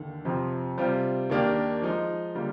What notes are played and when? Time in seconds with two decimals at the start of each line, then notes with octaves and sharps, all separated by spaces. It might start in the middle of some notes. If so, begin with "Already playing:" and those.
Already playing: D#2 D3
0.25 F2 C3 F3
0.78 C3 G3 C4 F4
1.30 D#2 D#3 A#3 D4 G4
1.82 F3 G#3 D#4
2.35 D3 G3 A#3 F4